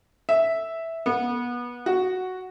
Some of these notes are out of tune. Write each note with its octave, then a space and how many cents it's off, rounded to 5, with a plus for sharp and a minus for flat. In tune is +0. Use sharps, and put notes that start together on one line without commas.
E5 -5
B3 -25
F#4 +0